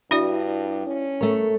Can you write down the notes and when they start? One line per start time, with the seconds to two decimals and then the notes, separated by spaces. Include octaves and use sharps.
0.11 G2 D4 E4 F#4 D5
0.86 C#4
1.21 A3 A#4 C#5